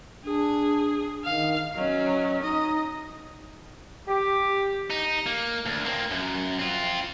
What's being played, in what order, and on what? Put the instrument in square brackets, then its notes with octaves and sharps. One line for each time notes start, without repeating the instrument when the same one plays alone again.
[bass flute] D4 [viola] G#4
[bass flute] D#3 [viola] F5
[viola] F#3 C#4 [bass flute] D#5
[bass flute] D#4 [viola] D#5
[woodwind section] G4
[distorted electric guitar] D#4
A#3
D2
A#3 C4
F#2
C4 F4